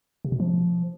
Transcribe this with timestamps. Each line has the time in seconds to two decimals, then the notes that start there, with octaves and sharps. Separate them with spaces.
0.25 C3
0.32 B2
0.40 F3